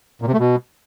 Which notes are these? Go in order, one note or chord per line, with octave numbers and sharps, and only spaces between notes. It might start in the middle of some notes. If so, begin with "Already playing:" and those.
A#2
C3
A3
B2